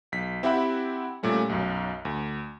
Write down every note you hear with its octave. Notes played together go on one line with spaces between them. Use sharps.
B1 B6
C4 E4 G4 E5 F#5 B5
A#2 G3 A3 C#4
B1 F#2
D2